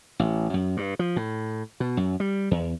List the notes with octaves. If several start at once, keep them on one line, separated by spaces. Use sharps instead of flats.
A1
F#2
G2
F3
A2
B2
F#2
G3
E2